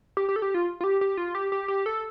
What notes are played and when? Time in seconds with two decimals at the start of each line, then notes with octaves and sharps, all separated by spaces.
0.17 G4
0.29 G4
0.36 A4
0.42 G4
0.54 F4
0.81 F4
0.84 G4
1.01 G4
1.17 F4
1.35 G4
1.52 G4
1.68 G4
1.86 A4